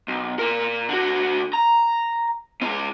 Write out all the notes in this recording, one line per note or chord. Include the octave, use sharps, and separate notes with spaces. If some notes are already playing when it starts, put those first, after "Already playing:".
B1
A#2 A#4
D3 F#4
A#5
C#2 C#4